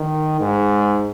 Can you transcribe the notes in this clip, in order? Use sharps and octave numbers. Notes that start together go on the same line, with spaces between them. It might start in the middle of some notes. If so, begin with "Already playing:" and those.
Already playing: D#3
G#2